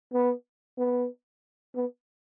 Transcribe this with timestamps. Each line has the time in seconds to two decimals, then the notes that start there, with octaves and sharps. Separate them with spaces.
0.13 B3
0.78 B3
1.76 B3